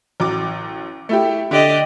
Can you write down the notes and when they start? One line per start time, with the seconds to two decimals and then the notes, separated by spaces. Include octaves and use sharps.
0.20 A1 F#3 D6
1.09 A3 E4 G4
1.51 D3 G4 D5 D#5